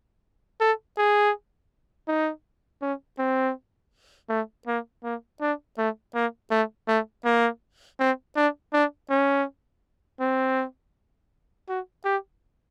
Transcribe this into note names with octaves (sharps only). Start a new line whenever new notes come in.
A4
G#4
D#4
C#4
C4
A3
A#3
A#3
D4
A3
A#3
A3
A3
A#3
C4
D4
D4
C#4
C4
F#4
G4